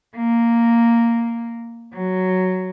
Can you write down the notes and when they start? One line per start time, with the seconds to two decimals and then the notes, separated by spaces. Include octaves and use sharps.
0.15 A#3
1.92 F#3